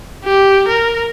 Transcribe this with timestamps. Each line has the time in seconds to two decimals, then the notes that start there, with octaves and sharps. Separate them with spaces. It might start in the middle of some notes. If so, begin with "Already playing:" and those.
0.25 G4
0.68 A#4